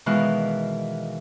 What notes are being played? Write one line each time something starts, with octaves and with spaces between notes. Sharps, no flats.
B2 D#3 E3 G#3 F5 F#6